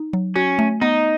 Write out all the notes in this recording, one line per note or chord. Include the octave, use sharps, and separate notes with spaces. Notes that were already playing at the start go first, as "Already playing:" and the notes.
Already playing: D#4
F#3
C#4 F#4
A3
B3 D#4